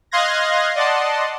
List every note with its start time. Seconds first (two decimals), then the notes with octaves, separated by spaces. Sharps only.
0.11 D#5 F5 C6 F#6 G#6 A#6
0.75 D5 D#5 F#5 A5 C6